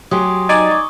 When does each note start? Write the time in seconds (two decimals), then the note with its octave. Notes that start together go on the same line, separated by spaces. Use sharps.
0.11 F#3 G4 G#5 C6 D#6
0.49 D#4 D5 G#5 D#6
0.71 C#6